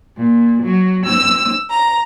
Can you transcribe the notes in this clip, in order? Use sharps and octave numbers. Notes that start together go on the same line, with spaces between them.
A#2
F#3
E6
A#5